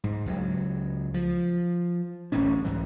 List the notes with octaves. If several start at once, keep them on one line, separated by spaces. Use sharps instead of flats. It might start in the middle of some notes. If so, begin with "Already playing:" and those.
G#2
C#2 F#3
F3
D1 A1 G#2 C#4
C2 G#2 E3